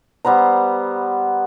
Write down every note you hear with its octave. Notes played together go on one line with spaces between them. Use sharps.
G3 B3 C5 A#5